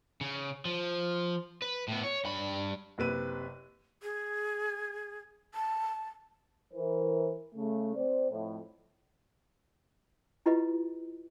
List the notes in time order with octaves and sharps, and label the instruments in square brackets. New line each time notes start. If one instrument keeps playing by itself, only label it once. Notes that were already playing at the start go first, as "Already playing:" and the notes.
[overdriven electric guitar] C#3
F3
B4
A2 B3
C#5
G2 B5
[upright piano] F#1 C3 B4 D#7
[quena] G#4
[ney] A5
[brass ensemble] E3 A#4 C5
C#3 A3
C4 C5 D5
F2 A2
[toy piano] E4 F4 G4 B4 D#5